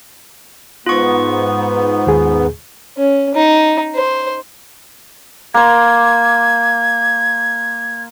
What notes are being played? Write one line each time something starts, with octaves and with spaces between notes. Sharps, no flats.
G#2 B3 F4 C#6
D#2 G#4
C#4
D#4
C5
A#3 C6 G#6